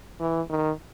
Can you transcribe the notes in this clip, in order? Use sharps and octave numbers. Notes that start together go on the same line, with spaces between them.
E3
D#3